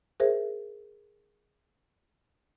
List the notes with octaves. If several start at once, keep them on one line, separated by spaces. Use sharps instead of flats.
G#4 A#4 C5 E5